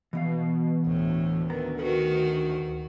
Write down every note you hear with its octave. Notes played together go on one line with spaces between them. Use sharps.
B2 E3 B3 F5
D2 A2
D#3 B3 A#5
D#3 F#4 A4 B4